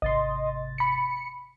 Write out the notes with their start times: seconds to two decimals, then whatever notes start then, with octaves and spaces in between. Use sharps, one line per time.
0.02 G#1 C3 D#5 C6 A6
0.78 B5 C#7